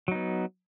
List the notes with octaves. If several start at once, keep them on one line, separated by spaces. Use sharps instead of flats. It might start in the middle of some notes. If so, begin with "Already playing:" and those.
F#3 B3 D#4